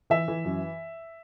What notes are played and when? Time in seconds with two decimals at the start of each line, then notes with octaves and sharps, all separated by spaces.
0.10 E3 E5
0.28 E3
0.45 F#2